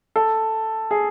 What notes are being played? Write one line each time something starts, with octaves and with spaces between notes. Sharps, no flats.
A4
G#4